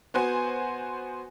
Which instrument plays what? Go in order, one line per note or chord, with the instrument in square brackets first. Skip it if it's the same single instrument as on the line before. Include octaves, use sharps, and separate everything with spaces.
[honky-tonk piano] B3 F#4 C5 G#5